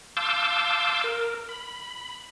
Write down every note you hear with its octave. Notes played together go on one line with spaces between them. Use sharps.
F5 A5 C6 D6 E6 G6
A#4
B5